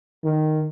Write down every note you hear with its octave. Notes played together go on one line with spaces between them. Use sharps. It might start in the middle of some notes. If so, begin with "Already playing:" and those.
D#3